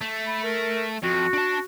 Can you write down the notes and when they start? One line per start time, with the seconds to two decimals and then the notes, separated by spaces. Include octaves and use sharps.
0.01 A3
0.27 B5
0.44 A#4
1.03 F2 F#4
1.34 D4 A5